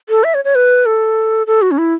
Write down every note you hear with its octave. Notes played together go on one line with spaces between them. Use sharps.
A4
E5
C#5
C#5
B4
A4
A4
F#4
C#4
E4